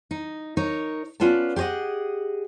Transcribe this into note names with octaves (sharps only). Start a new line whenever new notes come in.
D#4
D#4 A#4 C#5
B3 C#4 F4 B4 D5 A5
G4 G#4 C#5 D#5 F#5